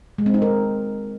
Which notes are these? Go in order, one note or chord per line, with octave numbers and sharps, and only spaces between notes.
G#3
C4
D#4
A#4